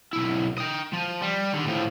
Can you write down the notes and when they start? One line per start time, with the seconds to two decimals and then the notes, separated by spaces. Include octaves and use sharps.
0.13 B1 E4
0.58 D#5 G5
0.93 F3
1.22 G3
1.53 D3 D#3
1.67 A2 F3